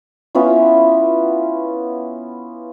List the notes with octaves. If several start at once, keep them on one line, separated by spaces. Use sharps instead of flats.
B3 C#4 E4 F4